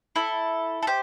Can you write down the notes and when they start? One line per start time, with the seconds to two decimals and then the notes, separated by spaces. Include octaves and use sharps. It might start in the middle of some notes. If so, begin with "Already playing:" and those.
0.16 E4 A4
0.82 A4
0.87 G4 C5